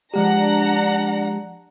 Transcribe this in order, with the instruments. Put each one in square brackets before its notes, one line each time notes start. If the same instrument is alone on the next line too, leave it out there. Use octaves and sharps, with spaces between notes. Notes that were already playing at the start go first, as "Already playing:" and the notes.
[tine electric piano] F3 G#3 G4 [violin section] D4 F#5 A#5